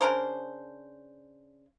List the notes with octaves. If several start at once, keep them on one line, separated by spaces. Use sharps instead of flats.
C#3 D4 A#4 C5